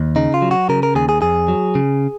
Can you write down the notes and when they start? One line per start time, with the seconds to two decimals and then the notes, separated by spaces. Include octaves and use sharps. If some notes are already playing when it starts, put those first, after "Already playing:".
Already playing: D#2
0.16 C#3 D#4
0.34 F4
0.42 F#3
0.51 F#4
0.69 C#3 A#4
0.83 A#4
0.95 D#2 G#4
1.09 G#4
1.22 F2 G#4
1.48 F#3
1.75 C#3